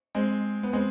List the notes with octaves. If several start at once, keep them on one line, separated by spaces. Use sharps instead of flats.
G#3 C4
B3
G#3 C4